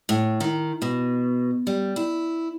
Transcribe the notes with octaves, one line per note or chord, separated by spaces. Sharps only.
A2
D#3
B2
G3
E4